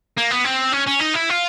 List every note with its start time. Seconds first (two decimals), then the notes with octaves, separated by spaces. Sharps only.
0.17 A#3
0.31 B3
0.45 C4
0.73 C#4
0.88 C#4
1.01 D#4
1.15 E4
1.30 F4